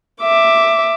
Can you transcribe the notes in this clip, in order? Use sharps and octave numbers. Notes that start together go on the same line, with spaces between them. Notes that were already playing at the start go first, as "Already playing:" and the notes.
E5 D6